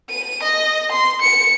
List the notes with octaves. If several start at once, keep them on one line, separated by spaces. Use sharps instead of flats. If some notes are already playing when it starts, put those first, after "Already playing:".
D#7
D#5
C6
C#7